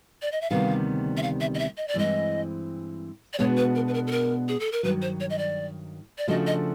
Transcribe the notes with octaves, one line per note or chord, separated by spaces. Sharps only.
D5
D#5
E5
D2 C3 D#3 G3 B3 F5
E5
F5
E5
D#5
E5
D#5
D5
G2 E3 G#3 C4 D#5
D5
B2 G#3 B3 D4 F#4 C#5
B4
A#4
B4
A#4
A4
A#4
G#4
A4
A#4
G2 D#3 F#3 B4
C5
C#5
D#5
D5
D5
C#3 F3 A3 D4 F#4 D#5
D#5